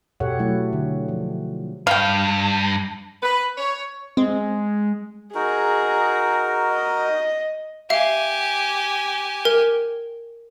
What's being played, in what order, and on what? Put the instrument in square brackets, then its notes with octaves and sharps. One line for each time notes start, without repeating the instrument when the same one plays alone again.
[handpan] B2 G4 A4 C#5 E5 F#5
F#3 A3 E4
D3
F3
[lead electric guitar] G2 [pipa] F5 G5
[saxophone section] B4
C#5
[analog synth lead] G#3 [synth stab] C4
[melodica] D#4 F#4 A#4 [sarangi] G#4
[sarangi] D#5
[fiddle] G4 G#5 [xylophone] E5 F5
[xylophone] A#4